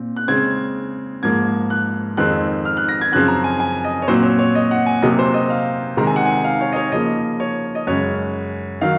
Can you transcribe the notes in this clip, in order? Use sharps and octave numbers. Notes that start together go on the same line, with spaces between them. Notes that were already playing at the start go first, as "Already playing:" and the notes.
Already playing: A#2 C4
F#6
C#3 G#3 C4 G#6
G#2 F3 A#3 G#6
F#6
F2 D#3 G#3 C4 F#6
F6
F#6
A#6
G#6
F#2 C#3 F3 C4 F#6
A#5
G#5
G#5
D#5
C#5
A#2 F#3 C4 C5
C#5
C#5
D#5
F#5
G#5
C3 F#3 A#3 D#5
C5
D#5
F5
C3 D#3 G#3 C4 A#5
G#5
F#5
G#5
F5
C#5
D#5
C#5
C#3 F3 A#3 D#5
C#5
D#5
F#2 C#3 G#3 C#5
D#3 F#3 F5